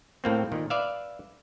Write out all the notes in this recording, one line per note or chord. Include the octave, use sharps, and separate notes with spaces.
A2 A#3 C4
A#2 D#3
B4 D5 E5 F5